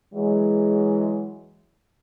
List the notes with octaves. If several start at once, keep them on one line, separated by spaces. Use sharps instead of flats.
E3 F#3 G#3